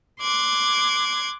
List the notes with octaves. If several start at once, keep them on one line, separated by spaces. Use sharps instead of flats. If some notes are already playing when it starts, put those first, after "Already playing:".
C6 D6 F#6 G#6